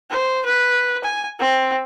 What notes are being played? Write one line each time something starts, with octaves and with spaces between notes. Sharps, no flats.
C5
B4
G#5
C4